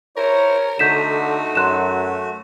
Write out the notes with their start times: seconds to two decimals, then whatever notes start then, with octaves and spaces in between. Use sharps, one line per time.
0.17 E4 A#4 C5 C#5 A#5
0.79 D3 A3 D#4 F#4 G6 B6 E7
1.55 F#2 C6 F#6 E7